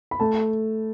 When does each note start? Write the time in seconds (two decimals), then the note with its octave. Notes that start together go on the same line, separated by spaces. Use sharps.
0.11 B5
0.20 A3 A5